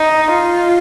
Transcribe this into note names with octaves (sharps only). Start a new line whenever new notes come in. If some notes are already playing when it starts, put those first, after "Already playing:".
Already playing: D#4
F4